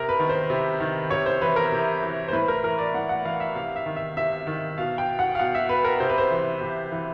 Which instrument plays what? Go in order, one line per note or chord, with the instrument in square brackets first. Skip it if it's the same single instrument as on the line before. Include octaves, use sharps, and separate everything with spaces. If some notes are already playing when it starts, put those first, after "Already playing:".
Already playing: [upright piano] C3 A#4
B4
D#3
C5
C3
D#3
C3 C#5
C5
E3 B4
A#4
C3
E3
C5
A2 B4
A#4
E3 A#4
D5
A2 F#5
F#5
E3 F5
E5
C3 F5
E5
D#3
E5
C3 E5
D#3
B2 F5
G5
F#5
F5
B2 F#5
E5
B4
A#4
C3 C5
B4
C5
E3
C3
E3